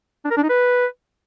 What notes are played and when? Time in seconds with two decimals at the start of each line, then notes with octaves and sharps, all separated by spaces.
0.25 D4
0.31 A#4
0.37 D4
0.43 D#4
0.49 B4